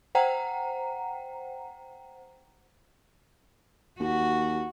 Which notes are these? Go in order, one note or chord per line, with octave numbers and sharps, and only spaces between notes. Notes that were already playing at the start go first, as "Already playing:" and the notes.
C5 F#5 G5 A#5
D#2 F#4